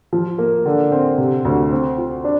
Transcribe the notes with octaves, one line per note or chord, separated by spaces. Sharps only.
F3
A#3
D3
C4
C3
D2
C4
F4
D4